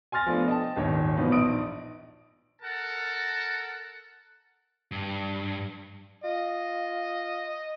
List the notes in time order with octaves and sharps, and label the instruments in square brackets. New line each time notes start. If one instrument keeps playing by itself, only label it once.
[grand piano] G#5 C6 F6 A6 A#6
F3 A3 B3 D4
D#5 G5 A5
D#1 G#1 D#3 C#5
B2 E3 F3 B3 D#4 F4
A#1 D#4 D#6 D7
[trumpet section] A4 A#4 F#5 A5
[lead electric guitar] G2
[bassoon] F4 [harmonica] D#5